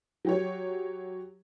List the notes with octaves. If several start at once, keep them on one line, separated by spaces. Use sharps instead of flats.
F#3 G4 C#5